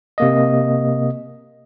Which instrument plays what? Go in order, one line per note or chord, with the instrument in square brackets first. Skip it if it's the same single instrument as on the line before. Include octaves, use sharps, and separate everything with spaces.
[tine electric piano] C3 A#3 D#5